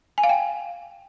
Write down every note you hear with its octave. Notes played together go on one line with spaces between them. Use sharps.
G#5
F5
G5